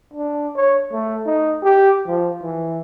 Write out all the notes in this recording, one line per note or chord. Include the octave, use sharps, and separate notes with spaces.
D4
C#5
A3
D#4
G4
F3
E3